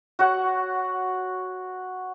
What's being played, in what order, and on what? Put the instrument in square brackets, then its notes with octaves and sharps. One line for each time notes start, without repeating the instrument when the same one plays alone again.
[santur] F#4 C#5 F#5